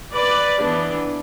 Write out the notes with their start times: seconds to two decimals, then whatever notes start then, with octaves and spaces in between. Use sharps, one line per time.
0.14 B4 D5
0.61 E3 B3 D4